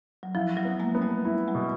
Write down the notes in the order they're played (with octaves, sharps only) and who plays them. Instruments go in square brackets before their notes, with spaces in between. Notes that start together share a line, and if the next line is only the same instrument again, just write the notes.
[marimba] F#3
[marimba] F3 [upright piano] E4
[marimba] F#3
[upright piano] B3
[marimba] G#3 A#3
[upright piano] B3
[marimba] G3 A3
[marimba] F#3 [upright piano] E4
[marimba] F#3 G#3
[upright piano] B2